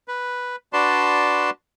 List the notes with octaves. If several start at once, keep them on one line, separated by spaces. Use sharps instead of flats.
B4
D4 F#4 B4 D5 A5 C6